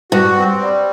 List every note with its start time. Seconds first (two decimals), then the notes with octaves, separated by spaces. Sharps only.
0.12 G2 F#4
0.37 C4
0.61 G3